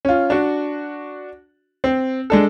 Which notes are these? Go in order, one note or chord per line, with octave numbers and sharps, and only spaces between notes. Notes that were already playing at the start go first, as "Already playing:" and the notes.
C#4 F4
D4 F#4
C4
G#3 D4 A4